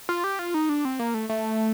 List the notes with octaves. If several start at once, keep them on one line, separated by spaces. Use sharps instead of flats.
F4
G4
F4
D#4
D4
C4
A#3
A3
A3